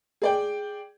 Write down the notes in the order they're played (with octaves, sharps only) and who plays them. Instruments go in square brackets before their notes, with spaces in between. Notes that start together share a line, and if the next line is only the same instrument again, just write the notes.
[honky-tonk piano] G#4 D5 G5